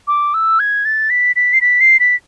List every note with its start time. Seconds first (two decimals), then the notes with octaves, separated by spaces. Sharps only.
0.08 D6
0.34 E6
0.60 G#6
0.85 A6
1.10 B6
1.36 B6
1.53 C7
1.61 B6
1.81 C7
2.00 B6